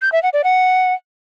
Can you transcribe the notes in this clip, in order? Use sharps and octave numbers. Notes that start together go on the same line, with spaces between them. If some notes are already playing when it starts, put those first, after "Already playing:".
G6
E5
F#5
D5
F#5